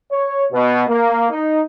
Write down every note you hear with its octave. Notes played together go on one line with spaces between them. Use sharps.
C#5
B2
A#3
D#4